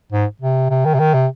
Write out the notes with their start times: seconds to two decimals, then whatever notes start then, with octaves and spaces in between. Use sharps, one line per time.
0.12 G#2
0.42 C3
0.70 C3
0.85 D#3
0.95 C3
1.00 D#3
1.14 C3